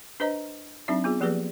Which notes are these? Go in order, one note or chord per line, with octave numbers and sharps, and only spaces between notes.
D4 B4 C5 D#5 A#5
F#3 C4 D4 D#4 E5
B3 F4 G#4
F3 A#3 G4 G#4 B4 D5